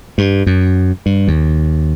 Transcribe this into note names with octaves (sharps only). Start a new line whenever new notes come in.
G2
F#2
G2
D#2